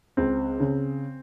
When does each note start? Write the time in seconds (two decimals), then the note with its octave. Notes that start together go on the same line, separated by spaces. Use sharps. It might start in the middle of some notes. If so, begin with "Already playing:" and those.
0.17 C#2 C4
0.60 C#3